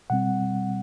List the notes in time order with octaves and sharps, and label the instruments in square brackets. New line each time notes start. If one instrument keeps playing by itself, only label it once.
[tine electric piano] B2 G3 C4 F#5